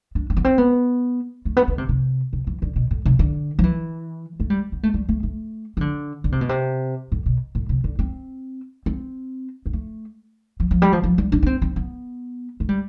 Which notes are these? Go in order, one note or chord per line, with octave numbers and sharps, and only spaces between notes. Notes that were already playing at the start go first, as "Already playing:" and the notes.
D4
C4
B3
C4
B3
A3
B3
D3
C3
C3
C3
E3
D3
B2
A2
C3
D3
F3
E3
A3
G3
B3
A3
G3
A3
A3
E3
D3
D3
C3
B2
C3
A2
B2
A2
C3
D3
C4
C4
B3
A3
F3
F3
G3
F3
F3
G3
D4
D4
C4
C4
B3
A3
G3